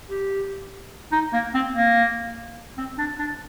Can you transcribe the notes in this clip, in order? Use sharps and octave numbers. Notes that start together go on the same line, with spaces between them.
G4
D#4
A#3
C4
A#3
C4
D4
D4